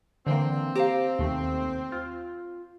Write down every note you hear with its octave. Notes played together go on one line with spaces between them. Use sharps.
D3 E3 A#3 C4
G4 C5 F5 A#5 D6
D#2 C3 A3
F4